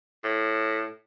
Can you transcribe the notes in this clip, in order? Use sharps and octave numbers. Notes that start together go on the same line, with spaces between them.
A2